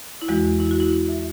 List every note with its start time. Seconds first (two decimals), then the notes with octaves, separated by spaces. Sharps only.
0.22 E4
0.28 E2 E3 G#3 F#4
0.60 E4
0.71 F#4
0.80 E4
1.09 E5